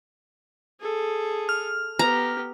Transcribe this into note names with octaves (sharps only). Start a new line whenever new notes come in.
G#4 A4
F6
B3 G4 A#5